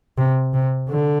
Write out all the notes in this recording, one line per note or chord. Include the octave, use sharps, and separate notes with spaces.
C3
C3
D3